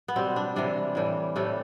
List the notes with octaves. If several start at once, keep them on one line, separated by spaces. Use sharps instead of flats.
B3
B2 G3 C4
D4
C3 E3 G3 D4
A2 E3 G3
A2 E3 G3 A3